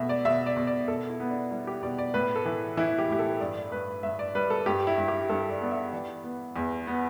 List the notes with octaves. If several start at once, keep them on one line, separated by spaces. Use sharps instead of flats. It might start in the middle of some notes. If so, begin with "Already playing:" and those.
Already playing: B2 A3 E5
D5
B2 E5
D5
B2
D5
B2 A4
E4
B3
D4
G3 E4
G4
B2 D5
D5
A2 B4
A4
E3
E3 E4
G4
A2 G4
A4
G2 D5
D5
G2 B4
G2 E5
D5
G3 B4
A4
G2 G4
E4
G2
G4
G2 A4
D5
B3 D5
E5
E3 D5
B3
E2
B3